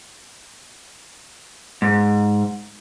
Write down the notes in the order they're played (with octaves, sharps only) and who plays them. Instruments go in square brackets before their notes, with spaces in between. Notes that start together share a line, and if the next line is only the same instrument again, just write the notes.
[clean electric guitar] G#2